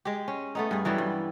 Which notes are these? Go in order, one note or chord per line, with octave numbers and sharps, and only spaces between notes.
G#3 G4
C#4
A3 B3 D#4
G2 G#4
E3 F#3 G3 B3
G2